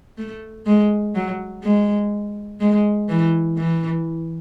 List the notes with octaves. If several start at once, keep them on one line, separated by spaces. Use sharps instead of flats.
A3
G#3
F#3
G#3
G#3
E3
E3